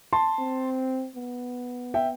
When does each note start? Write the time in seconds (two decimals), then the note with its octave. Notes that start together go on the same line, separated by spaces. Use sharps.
0.13 A5 C6
0.39 C4
1.16 B3
1.94 E5 G5